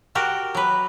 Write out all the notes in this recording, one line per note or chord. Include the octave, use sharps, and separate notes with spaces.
F#4 G4 A#4
F#3 B4